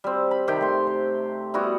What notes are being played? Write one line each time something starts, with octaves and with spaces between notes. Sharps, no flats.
G3 C4
B5
C3 D#3 G4 G5
A3 C6
C5
G3 B3 E4 F#4